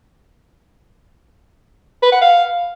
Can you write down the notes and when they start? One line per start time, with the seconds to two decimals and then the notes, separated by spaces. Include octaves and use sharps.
2.03 B4
2.12 F#5
2.21 F5